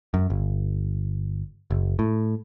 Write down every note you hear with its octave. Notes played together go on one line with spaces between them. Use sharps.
F#2
G1
F#1
A2